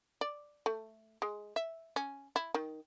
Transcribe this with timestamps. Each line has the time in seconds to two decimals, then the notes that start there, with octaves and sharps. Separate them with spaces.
0.21 D5
0.66 A3
1.22 G#3
1.56 E5
1.96 C#4
2.36 E4
2.54 D#3